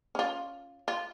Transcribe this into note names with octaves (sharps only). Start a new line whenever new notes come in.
C#4 F4
F4